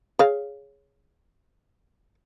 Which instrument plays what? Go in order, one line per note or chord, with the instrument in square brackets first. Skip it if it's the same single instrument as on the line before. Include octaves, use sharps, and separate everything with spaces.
[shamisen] G#4 C#5 F5